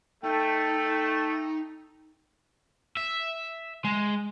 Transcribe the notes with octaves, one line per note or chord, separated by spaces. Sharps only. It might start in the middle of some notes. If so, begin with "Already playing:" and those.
A3 D#4 A4 G5
E5
G#3